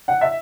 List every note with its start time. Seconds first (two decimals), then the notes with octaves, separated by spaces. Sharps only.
0.08 F#5
0.21 E5